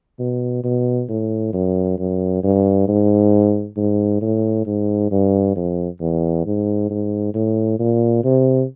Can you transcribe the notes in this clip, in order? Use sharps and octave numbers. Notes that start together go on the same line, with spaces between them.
B2
B2
A2
F#2
F#2
G2
G#2
G#2
A2
G#2
G2
F2
E2
G#2
G#2
A2
A#2
C3